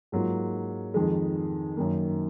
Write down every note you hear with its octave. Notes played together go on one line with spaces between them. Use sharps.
G#2 F#3 A#3 F4
F2 D#3 G#3
F#2 D#3 A#3